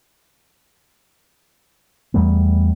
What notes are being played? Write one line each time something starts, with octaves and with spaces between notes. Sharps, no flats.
E2 G3 A3 B3